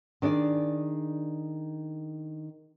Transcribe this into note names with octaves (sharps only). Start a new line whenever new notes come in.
D#3 D4 G#4 D5